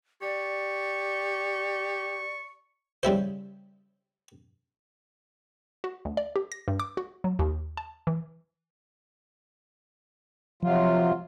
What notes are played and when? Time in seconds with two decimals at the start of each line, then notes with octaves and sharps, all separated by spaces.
0.22 G4 D5 C#6
3.03 C#3 G3 E4 C5
5.84 F#4
6.05 D2
6.17 D5
6.36 G4
6.52 A#6
6.68 G2
6.80 D6
6.97 F#4
7.24 F#3
7.39 D#2
7.77 A5
8.07 E3
10.63 C3 F3 F#3 F4